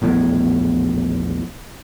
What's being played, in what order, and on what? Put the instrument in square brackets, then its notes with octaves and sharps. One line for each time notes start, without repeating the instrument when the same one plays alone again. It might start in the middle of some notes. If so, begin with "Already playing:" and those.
[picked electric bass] A#1 E2 A2